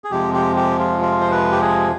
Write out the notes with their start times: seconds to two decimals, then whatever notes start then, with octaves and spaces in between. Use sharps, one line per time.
0.04 G#4
0.11 F2 C3 F3 G#3 G4
0.34 G4
0.56 G4
0.79 F4
1.02 F4
1.21 C5
1.31 B4
1.52 G4
1.62 G#4